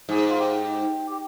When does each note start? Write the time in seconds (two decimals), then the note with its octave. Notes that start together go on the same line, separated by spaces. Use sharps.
0.09 G#2 G#4
0.29 F4
0.40 G4
1.11 G4